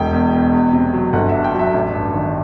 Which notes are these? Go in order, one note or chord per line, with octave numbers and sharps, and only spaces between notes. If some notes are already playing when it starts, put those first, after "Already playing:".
Already playing: E1 G5
E2
B2
E2
C3
F#3
G1 F#5
G2 E5
G5
F#3 E5
A1
G2
D#3